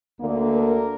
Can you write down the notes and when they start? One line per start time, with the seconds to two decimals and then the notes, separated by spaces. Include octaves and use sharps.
0.19 D2 D3 A#3
0.51 A#4